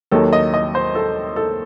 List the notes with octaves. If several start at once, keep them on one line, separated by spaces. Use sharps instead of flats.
D#2 D#3 F#3 A4
D#5
D#5
C5
A4
A4